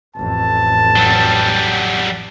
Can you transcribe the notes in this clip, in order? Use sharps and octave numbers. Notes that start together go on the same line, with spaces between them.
A1 F2 A5
F#3 G3